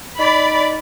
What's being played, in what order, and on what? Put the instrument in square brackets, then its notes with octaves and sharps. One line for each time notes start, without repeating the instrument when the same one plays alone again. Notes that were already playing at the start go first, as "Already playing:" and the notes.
[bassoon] D#4 [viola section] D5 B5